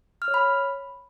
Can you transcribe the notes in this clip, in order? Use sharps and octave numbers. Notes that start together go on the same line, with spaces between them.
F6
C#5
B5